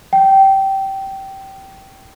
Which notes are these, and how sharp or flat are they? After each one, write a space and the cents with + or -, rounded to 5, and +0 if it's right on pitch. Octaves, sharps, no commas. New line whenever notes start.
G5 -15